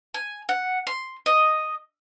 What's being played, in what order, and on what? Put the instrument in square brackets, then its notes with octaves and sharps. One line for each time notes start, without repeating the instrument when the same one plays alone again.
[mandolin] G#5
F#5
C6
D#5